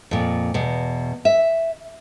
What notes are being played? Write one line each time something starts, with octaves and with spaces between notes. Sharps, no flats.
F2 A#2
E2 B2
E5